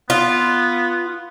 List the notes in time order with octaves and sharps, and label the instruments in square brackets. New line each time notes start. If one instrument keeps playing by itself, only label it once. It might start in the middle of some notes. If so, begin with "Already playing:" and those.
[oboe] B3 [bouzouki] F4